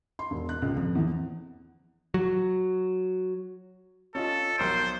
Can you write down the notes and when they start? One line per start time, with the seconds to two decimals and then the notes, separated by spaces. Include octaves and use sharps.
0.19 C6
0.31 E1
0.49 F#6
0.62 C#2
0.77 F2
0.95 E2
2.14 F#3
4.15 C#4 F4 A4 D#5
4.58 B1 A#4 C5 D7